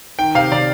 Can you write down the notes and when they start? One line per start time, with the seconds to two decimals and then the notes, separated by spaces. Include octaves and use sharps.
0.19 D#3 G5
0.35 C3 F5
0.52 C3 D5